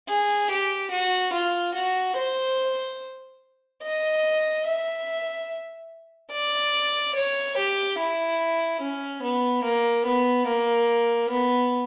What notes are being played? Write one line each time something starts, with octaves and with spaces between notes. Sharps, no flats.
G#4
G4
F#4
F4
F#4
C5
D#5
E5
D5
C#5
G4
E4
C#4
B3
A#3
B3
A#3
B3